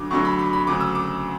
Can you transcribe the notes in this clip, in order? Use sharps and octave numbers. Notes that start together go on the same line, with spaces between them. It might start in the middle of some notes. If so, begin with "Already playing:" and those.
Already playing: D2 D3 F#3 D6
D2 D3 F#3 C#6
B5
B5
B5
D2 C#3 F#3 D6
E6
D6